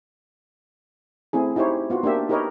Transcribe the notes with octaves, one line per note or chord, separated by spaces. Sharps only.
A3 C4 E4 G#4
D#4 E4 G4 C5 C#5
B3 F4 F#4
A#3 D4 G4 E5
D#4 G4 A#4 B4 C#5 D#5